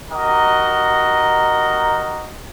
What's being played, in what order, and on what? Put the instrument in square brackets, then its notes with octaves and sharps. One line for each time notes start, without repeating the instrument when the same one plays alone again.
[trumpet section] D#4 F#4 G4 A#4 D#5